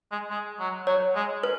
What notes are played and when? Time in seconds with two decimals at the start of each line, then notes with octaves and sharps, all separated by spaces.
0.12 G#3
0.30 G#3
0.59 F#3
0.87 F#3 C#5
1.15 G#3
1.43 B4